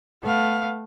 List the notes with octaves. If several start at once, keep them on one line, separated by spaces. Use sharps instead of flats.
A3 B3 F5